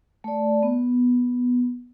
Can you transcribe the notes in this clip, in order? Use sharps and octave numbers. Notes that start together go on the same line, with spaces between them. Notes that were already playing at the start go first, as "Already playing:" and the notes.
A3 D5
B3